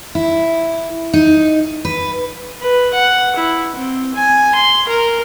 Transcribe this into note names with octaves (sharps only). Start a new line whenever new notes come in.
E4
D#4
B4
B4
F#5
E4
C4
G#5
C6
A#4